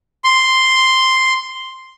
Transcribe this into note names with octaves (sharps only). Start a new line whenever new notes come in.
C6